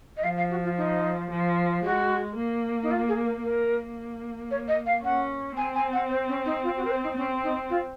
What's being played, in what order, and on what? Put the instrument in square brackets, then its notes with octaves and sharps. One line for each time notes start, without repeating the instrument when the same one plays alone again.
[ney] D#5
[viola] F3 [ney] F5
[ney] F5
F#4
F4
D#4
[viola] F3
[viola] G#3 [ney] F#4
[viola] A#3
[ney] D#4
F4
G#4
A#4
[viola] A#3 [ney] A#4
[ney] C#5
D#5
F5
[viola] C#4 [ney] F#5
[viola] C4 [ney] G#5
[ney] G#5
F#5
C5
C#4
D#4
F4
F#4
A#4
C5
D#4
[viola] C4 [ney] C#4
[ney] D#4
F4